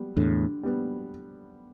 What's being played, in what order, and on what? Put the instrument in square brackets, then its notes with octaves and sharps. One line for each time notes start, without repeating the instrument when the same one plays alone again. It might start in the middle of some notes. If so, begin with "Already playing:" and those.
Already playing: [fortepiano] G3 B3
[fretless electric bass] E2 A2 [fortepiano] D3
[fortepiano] G3 B3